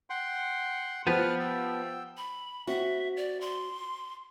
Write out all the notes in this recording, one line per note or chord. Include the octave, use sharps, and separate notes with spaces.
F#5 G5 C6
F3 B3 G4 B4 F#5 F6
G5 E6
B5
C4 F#4 E5
D5
C6